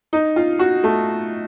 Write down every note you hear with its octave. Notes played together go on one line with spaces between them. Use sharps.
D#4
F4
F#4
A3